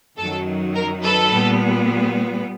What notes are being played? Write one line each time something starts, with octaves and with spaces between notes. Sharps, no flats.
F#2 D#3 F#3 A4
A#4
A4 B4
A#2 G3 B3